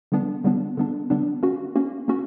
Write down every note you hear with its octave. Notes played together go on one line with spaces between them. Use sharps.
D3 G3 B3 D4
D3 G3 B3 D4
D3 G3 B3 D4
D3 G3 B3 D4
A#3 C#4 F#4
A#3 C#4 F#4
A#3 C#4 F#4